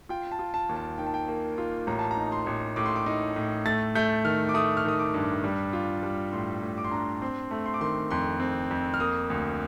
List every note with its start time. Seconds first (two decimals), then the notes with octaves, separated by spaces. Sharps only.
0.09 F4 G5
0.32 A5
0.39 F4
0.54 A5
0.69 D#2
0.76 A5
0.98 D#3 G5
1.07 A5
1.14 G5
1.28 A#3
1.58 F4
1.87 A1 A#5
1.99 A5
2.11 A#5
2.17 D#4
2.32 C6
2.46 A1
2.76 A2 D6
2.86 C6
2.96 D6
3.06 D#4
3.36 A2
3.65 A3 A6
3.95 A3 G6
4.25 D#3 F6
4.49 D6
4.54 A3 D#6
4.77 F6
4.85 D#3 D#6
4.99 D6
5.14 G2
5.44 G3
5.73 F4
6.03 G3
6.32 A2 C6
6.62 A2
6.78 D6
6.84 C6
6.91 D4 A#5
6.98 C6
7.22 C4 C6
7.51 A3
7.66 C6
7.74 D6
7.81 D#3 C6
8.11 F2 C6
8.40 C4
8.71 F2
8.94 F6
9.00 A#3 D#6
9.30 D2